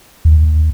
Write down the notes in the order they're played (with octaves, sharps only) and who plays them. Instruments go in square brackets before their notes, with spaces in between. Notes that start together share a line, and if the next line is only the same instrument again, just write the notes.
[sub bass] D#2